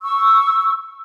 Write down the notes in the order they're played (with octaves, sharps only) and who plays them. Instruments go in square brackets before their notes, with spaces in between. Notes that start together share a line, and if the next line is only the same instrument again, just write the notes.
[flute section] C#6 E6